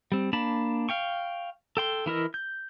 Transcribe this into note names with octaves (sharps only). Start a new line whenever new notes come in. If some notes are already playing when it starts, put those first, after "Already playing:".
G3 C4
A#3 D4 A5 B5
F5 G5 C#6
A4 G5 C6
E3 E4 A#4 D#5
G6